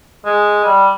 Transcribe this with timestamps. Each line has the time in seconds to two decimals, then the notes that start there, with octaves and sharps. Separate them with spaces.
0.25 G#3
0.65 G3